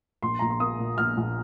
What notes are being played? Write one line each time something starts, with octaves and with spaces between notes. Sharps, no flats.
A#1 C6
A#1 A#5
C6
A#3 D#6
A#2
A#1 F6
A#1